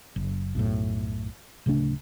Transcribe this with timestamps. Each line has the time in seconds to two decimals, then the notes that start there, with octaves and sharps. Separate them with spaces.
0.16 F#1
0.55 B1 F#2 A2
1.66 D1 C#3 A3 D4